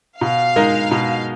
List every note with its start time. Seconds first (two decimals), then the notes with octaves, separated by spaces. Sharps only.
0.21 B2 F5
0.56 G#3 D#4 A#4
0.91 B2